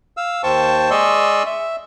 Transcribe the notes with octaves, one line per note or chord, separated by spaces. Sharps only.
F5 E6
D#2 C5 G5 A5 C#6
G#3 D5 D#5 C6 C#6 E6
E5